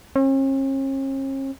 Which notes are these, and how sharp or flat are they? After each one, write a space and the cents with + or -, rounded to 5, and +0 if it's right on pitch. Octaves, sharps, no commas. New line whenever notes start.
C#4 -45